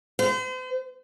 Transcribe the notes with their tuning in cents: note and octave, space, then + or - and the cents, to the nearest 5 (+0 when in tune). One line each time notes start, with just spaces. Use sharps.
C5 -40